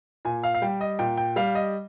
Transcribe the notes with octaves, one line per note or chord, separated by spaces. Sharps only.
A#2 G#5
F5
F5
G3 G5
D#5
A#2 G5
G5
G3 F5
D#5